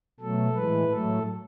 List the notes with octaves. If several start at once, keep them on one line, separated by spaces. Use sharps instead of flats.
B2 F#3 A3 A4
A2 E3 G#3 B4
A2 F#3 A3 A4